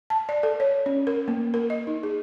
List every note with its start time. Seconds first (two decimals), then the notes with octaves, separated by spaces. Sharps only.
0.10 A5
0.29 D5
0.43 A4
0.60 C#5
0.86 C#4
1.07 A#4
1.28 A#3
1.54 A#4
1.70 D#5
1.87 D#4
2.03 G#4